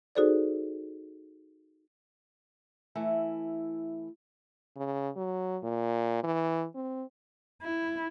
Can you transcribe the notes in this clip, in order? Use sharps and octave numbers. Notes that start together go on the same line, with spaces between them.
D#4 F#4 G#4 A4 C5 D5
E3 A3 E4 G#5
C#3
F#3
A#2
E3
C4
E4